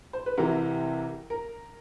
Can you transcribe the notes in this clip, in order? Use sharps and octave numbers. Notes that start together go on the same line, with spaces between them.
C5
B4
C2 C3 E3 A#4
A#4